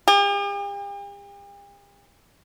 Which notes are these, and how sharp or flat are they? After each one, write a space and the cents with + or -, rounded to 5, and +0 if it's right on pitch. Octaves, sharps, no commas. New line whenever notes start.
G4 +45